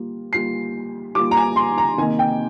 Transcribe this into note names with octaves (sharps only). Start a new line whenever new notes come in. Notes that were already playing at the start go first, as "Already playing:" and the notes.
Already playing: G3 A#3 F4
G3 A#3 F4 C7
G3 A#3 F4 D6
A#5
G#5
C6
A#5
C3 D#3 A#3 D#4 G#5
G5